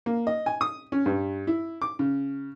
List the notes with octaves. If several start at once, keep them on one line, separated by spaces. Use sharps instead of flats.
A#3
D#5
G#5
D#6
C#4
G2
E4
D6
C#3